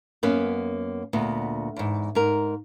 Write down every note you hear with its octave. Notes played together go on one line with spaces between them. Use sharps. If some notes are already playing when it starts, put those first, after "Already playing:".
F#2 A#3 B3 C#4 B4
D2 A#2 B3
E2 G#2
G#2 A#4